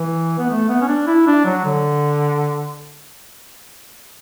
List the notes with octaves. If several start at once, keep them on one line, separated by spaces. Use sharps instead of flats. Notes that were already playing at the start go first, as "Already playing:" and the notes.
Already playing: E3
B3
A3
B3
C#4
D4
E4
D4
F#3
D3